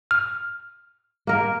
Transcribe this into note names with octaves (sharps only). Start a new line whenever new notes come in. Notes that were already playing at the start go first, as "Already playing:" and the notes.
F6
A#3 A#4